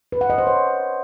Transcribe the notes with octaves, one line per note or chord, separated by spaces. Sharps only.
B4
F#5
D#5
C5
C#5